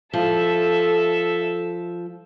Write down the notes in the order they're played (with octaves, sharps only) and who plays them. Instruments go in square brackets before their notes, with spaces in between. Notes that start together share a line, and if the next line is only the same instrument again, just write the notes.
[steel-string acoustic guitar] F3 [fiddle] A4 E5